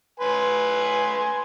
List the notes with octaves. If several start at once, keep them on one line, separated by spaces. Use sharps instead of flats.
B4 G#5 C6